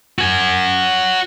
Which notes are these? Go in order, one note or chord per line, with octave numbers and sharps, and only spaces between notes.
F#4 G#5